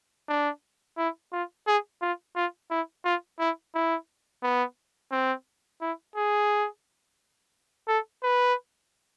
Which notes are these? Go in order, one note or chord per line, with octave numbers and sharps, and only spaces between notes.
D4
E4
F4
G#4
F4
F4
E4
F4
E4
E4
B3
C4
E4
G#4
A4
B4